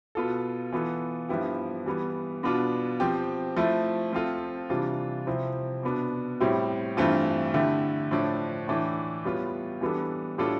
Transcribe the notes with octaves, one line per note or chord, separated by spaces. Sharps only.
B2 B3 F4 A4
E3 B3 F4 A4
G2 F3 B3 E4 G4
E3 G3 B3
B2 B3 D4 F4
F3 C4 G4
F3 A3 E4
F3 C4 F4 A4
C3 E3 G3 D4 F4
C3 F3 C4 E4
B2 B3 D4
A2 G3 C4 E4 G4
G2 E3 A3 C4 F4
D3 A3 E4 G4
A2 F3 A3 D4
A2 E3 A3 D4
A2 G3 B3 F4
E3 G3 B3 D4 A4
A2 G3 D4 F4 A4